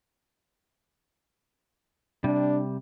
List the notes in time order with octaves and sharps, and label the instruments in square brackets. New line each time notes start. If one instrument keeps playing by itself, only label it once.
[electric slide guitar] C3 G3 [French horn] D4